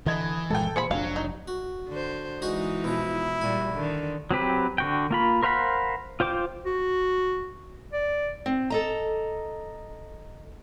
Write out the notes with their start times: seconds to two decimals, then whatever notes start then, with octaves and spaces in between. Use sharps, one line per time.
0.06 D3 E3 D#5 G#6
0.50 G1 A#2 G#3 A4 G5
0.76 A#2 G#4 C5 B5 C#7
0.91 F1 A#2 F#3 D4 F5
1.16 D#4
1.48 F#4
1.88 D3 C5
2.42 E3 G#3 D#4 F#4 G#4 D#5
2.84 B2 F3 E4
3.41 A#2 G3 F#4 G#5
3.73 D3 D#3
4.31 F#3 C4 G4 B4
4.78 D3 F#4 G5
5.11 A#3 F4 B5
5.43 A#4 C5 F5 F#5 B5
6.20 F4 C5 G5 D6
6.66 F#4
7.93 D5
8.46 C4
8.70 A4 D#5 A#5